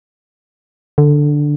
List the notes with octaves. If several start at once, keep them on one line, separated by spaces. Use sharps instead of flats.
D3